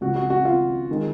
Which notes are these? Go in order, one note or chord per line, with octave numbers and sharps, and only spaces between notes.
C#2 C#3 F3 F#4
F#4
F#4
F4
D#3 G#3